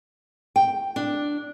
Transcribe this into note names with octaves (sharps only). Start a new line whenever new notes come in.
G5
D4